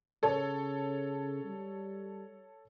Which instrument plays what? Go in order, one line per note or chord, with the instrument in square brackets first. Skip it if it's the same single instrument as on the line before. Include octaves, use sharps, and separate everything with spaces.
[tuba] C#3 [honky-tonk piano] A4 C#5
[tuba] G3